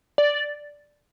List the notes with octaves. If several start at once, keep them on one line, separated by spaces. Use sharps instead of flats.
D5